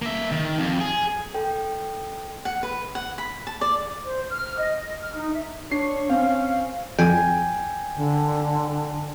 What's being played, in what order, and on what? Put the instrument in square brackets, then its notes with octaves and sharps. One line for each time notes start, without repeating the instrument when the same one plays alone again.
[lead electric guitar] A#3 E5
D#3
F2
G#4
[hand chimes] A4 G5
[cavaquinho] F#5
B4
F#5
B5
A5
D5
[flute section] C5
F6
D#5
D#5
F6
D#4
E5
[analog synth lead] D4 [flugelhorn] C#5 [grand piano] C7
[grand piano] C4 [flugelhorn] C#4 [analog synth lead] F5
[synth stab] F2 [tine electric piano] G5 G#5
[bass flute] D3